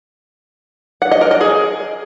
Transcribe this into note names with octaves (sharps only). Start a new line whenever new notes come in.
F#5
D#5
A#4
D#5
G#4